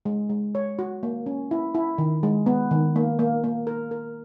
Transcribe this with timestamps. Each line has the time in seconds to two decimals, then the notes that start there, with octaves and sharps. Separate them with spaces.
0.05 G#3
0.30 G#3
0.55 C#5
0.79 F#4
1.03 A#3
1.26 C#4
1.51 E4
1.75 E4
1.98 D#3
2.23 G#3
2.46 B3
2.71 D#3
2.96 A#3
3.19 A#3
3.44 A#3
3.67 A#4
3.91 A#4